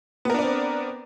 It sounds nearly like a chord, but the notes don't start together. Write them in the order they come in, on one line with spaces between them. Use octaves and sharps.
B3 A#4 D4 D5 C4